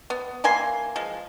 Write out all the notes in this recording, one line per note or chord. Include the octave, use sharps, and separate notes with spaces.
B3
E3 A#3 G#5 C6
F3 G#3